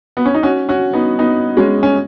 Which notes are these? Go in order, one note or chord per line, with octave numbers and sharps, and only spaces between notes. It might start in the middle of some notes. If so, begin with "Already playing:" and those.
B3
C#4
D#4
C#4 F#4
C#4 F#4
B3 D#4
B3 D#4
G#3 C#4
C#4